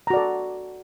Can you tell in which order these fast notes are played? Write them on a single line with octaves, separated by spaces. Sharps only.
A#5 F#4 D5 A4